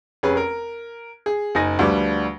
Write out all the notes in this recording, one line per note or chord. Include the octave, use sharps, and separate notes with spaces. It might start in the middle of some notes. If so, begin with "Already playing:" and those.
F1 C#4 G#4 B4
A#4
G#4
F#1 D#4 G#5 A#6
D2 F3 G3 B4 D6